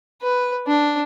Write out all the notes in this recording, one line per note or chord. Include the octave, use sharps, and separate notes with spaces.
B4
D4